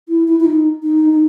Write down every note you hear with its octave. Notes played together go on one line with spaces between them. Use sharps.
E4
E4
E4
D#4
D#4
D#4